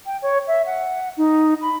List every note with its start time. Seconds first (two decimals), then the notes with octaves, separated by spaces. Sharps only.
0.06 G5
0.22 C#5
0.48 E5
0.66 F#5
1.17 D#4
1.62 B5